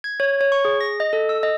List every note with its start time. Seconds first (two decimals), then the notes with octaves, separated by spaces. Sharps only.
0.04 G#6
0.20 C#5
0.41 C#5
0.52 C#6
0.65 G#4
0.81 A#6
1.00 D#5
1.13 A4
1.29 E6
1.43 D#5